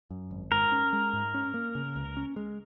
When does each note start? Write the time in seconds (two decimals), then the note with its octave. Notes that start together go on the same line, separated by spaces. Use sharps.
0.11 F#2
0.31 G#1
0.52 G#2 A#4
0.72 C#4
0.93 G#3
1.13 G#2
1.34 C#4
1.54 A#3
1.75 C#3
1.96 C#2
2.17 C#4
2.36 G#3